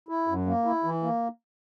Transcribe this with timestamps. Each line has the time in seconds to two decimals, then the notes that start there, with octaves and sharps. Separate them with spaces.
0.09 E4
0.28 F#2
0.46 A#3
0.65 E4
0.84 E3
1.03 A#3